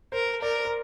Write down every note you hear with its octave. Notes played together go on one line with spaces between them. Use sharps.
A#4 C5
A#4 D5
A#4